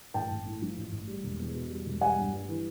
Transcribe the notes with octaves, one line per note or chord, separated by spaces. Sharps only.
A1 G5 A5
A1
A2
F3
A1
A1
G3
E1
E2
B2
G3
E1
G3 F#5 G#5
G1
G2
E3